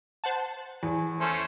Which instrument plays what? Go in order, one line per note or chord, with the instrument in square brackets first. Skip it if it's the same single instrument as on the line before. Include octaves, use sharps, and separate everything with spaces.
[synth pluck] C5 F#5 A5
[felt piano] E2
[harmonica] A3 C#4 C5